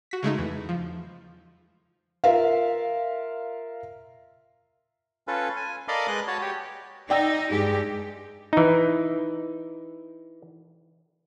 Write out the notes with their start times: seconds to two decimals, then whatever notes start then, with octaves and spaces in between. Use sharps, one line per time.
0.11 F#4 B6
0.23 C#3 G#3 A3 D#4
0.38 E2 E3
0.69 F3
2.24 F4 A#4 E5 F5
5.28 C#4 F4 A4 B4
5.57 G#5
5.88 A4 A#4 D5 D#5 F5 B5
6.07 G#3 B4 D#5 F#6
6.28 F#4 C#5 A5
6.41 G4 C#5
7.10 D#4 D5 G5 E6
7.51 G2 G#3 G4
8.53 E3 D#4